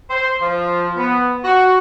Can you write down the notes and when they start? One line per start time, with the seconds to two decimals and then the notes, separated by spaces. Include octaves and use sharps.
0.10 C5
0.41 F3
0.97 B3
1.44 F#4